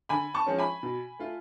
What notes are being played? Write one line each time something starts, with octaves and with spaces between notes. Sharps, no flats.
D3 G#5 B5
A5 C#6
F3 G#3 C#4
G#5 B5
B2
A3 F4